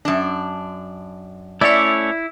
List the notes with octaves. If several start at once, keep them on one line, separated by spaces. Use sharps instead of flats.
F#2 D4
A3 C#4 E4 C#5 D5 E5